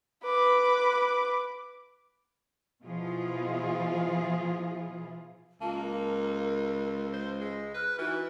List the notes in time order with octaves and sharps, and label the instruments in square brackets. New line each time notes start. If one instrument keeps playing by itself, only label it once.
[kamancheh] B4 D6
[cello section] B2 F3 E4 F4 G#4
[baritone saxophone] C#2 [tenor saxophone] A#3 [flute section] F4 A5
[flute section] A#4
[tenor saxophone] C5
G#3
[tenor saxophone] B4 [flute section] F6 F#6
[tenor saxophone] E3 [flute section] D#4 F#4